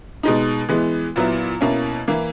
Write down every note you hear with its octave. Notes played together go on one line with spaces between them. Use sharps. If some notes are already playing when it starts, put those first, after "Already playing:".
B2 G#3 D#4
E3 G#3 B3
A#2 F#3 B3 E4
B2 A#3 C#4 E4
E3 A#3 E4